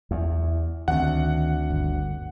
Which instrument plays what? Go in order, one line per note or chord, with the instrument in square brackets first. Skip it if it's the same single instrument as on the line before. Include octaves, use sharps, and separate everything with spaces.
[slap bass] E2
[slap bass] D2 [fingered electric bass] D#3 C4 [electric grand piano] F#5
[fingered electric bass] G1